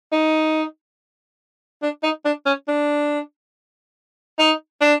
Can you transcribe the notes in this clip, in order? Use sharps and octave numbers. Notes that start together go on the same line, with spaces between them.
D#4
D4
D#4
D4
C#4
D4
D#4
D4